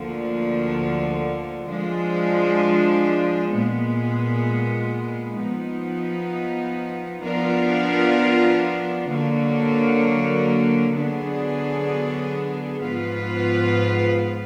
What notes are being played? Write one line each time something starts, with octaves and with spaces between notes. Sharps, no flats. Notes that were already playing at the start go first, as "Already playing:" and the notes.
Already playing: D2 D3 F3 A#3
F3 G#3 D4
A#2 G#3 B3
F3 B3 D#4
F3 B3 D4 F4 A#4
D3 F#3 A#3
D3 F#3 B3 D4 G#4
G#2 F3 B3 F4 B4